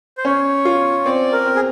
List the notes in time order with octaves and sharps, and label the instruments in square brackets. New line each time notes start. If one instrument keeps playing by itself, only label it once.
[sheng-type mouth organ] C5
[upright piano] C#4 [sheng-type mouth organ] C#5
[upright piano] F4
[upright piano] C4 [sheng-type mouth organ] D5
[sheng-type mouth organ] A#4
[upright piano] C4
[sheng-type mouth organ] G#4